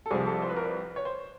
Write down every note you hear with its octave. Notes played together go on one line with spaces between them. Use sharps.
A4
C2 C3 F3 G#4
A4
C5
B4
A#4
B4
C#5
C5